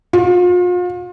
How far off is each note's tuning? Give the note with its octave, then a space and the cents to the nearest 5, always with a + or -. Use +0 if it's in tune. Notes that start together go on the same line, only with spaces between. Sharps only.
F4 +40